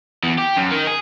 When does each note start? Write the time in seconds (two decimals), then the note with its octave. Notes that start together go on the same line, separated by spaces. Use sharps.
0.23 E2
0.39 G4
0.57 F#2
0.72 D#3
0.87 G#4